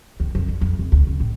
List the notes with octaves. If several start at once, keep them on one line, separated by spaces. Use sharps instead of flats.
D#2
F2
D3
F2
F1
D2
C#3
A2